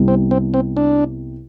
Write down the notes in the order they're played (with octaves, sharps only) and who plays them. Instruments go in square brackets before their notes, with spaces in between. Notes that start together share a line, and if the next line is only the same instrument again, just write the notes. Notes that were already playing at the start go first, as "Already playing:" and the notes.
Already playing: [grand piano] C2 C3 G3 B3 E4
[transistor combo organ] C4
C4
C4
D4